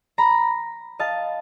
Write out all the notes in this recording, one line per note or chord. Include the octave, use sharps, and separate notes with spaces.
A#5 B5
D#5 F5 A5